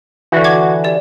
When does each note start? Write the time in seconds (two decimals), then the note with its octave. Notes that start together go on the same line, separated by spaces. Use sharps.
0.32 D3 E3 F#4
0.44 C#6 D6 G#6
0.84 G4 D5